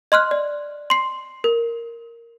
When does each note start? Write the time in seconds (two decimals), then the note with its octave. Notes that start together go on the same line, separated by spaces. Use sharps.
0.12 D#5 C6 F6 F#6
0.31 D5
0.90 C6 C7
1.44 A#4